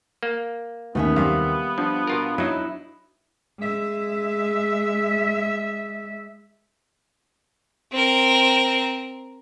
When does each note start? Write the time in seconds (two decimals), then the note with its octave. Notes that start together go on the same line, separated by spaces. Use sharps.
0.23 A#3
0.95 D#2 A3 B3 C#4 E5
1.16 C3 G3 E5 F5
1.78 F3 D4
2.07 B2 F4 A#4
2.38 F#3 D#4 E4
3.59 G#3 E5
7.92 C4 A#4